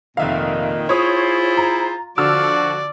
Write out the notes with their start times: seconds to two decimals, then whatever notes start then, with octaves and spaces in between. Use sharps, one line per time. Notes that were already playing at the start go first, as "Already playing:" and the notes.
0.17 F1 A#2 D#3 E5 F5
0.89 E4 F4 G#4 C5 C#5 D#6
1.57 A#5
2.18 D3 F3 F#4 D5 E6 F6